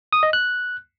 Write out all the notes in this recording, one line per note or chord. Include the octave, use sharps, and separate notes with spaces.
D#6
D#5
F#6